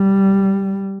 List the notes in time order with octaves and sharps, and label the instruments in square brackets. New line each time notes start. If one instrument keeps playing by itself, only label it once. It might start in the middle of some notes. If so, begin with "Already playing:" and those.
Already playing: [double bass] G3